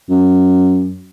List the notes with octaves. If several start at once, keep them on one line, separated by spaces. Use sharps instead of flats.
F#2